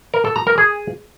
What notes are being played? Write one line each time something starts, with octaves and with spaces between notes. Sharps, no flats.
A#4
A4
A#5
A#4
G#4